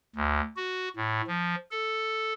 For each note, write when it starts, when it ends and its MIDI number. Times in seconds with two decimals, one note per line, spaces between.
0.16 0.41 38
0.57 0.89 66
0.97 1.22 45
1.27 1.55 53
1.71 2.33 69